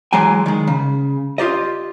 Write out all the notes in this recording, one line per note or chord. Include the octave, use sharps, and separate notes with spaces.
E3 F#3 G#3 G5 G#5
D#3 G#3
C#3
F4 G4 D5 D#5